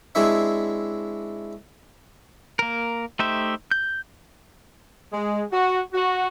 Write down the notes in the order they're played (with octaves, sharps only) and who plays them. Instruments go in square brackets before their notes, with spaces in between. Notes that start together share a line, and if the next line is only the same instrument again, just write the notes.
[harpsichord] G#3 C4 D4 E4 C#5 E5
[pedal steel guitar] A#3 A#4
A3 D#4 G4 C5 E5
G6
[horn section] G#3
F#4
F#4